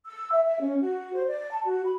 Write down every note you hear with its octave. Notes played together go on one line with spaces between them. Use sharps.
E6
E5
E5
C#4
F#4
C5
D5
A5
F#4
B5